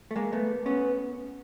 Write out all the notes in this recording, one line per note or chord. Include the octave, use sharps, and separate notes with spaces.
A3
G#3 A#3
A3 B3
B3 C#4